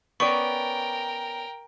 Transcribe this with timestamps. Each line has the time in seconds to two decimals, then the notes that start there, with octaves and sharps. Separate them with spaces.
0.20 B3 C#4 A#4 D5 G5 C#6